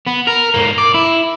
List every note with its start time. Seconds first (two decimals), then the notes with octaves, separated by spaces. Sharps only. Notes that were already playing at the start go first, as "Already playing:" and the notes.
0.07 B3
0.27 A#4
0.54 G#2 A#3
0.78 D5
0.94 E4